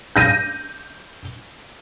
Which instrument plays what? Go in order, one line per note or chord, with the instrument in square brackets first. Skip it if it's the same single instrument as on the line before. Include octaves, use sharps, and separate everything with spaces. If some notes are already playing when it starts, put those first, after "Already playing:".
[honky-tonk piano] G6 A#6 D#7